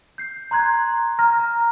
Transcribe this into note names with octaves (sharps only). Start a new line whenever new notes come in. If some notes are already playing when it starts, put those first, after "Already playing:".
G6 C7
A#5 C6 F#6 G#6
A#5 F6 A#6
A#5